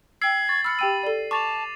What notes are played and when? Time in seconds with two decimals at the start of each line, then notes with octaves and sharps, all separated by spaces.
0.22 G5 E6 G#6 C7 F#7
0.49 C#6 A6
0.64 B5 E6 F6 C#7
0.79 G4 G5 E6 D#7
1.03 A4 D5
1.31 A5 C#6 D6 A6 F7